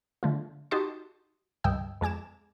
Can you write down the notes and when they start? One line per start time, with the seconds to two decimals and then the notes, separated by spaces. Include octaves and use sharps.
0.23 D3 A3 F4
0.71 D#4 F#4 G4 D#5 A5 C6
1.64 C#2 G2 D#5 G5 E6
2.01 F2 G#3 G#5 D6 E7